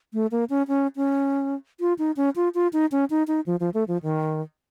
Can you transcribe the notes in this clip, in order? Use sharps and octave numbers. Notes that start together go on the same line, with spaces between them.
A3
A#3
C#4
C#4
C#4
F4
D#4
C#4
F4
F4
D#4
C#4
D#4
D#4
F3
F3
A3
F3
D#3